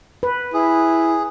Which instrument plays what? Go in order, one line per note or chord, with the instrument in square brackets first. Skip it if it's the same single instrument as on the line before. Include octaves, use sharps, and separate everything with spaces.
[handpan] B4
[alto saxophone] E4 [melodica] G#4